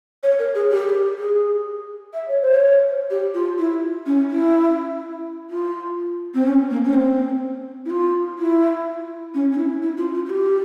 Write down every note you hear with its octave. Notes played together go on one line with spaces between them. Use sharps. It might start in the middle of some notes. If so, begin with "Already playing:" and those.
C#5
A#4
G#4
G4
G#4
E5
C#5
C5
C#5
G4
F4
E4
C#4
E4
F4
C4
C#4
A#3
C#4
C4
E4
F4
E4
C#4
C#4
E4
E4
F4
F4
F4
G4